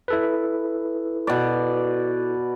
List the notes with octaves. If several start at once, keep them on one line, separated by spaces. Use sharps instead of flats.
E4 A4 B4
B2 D5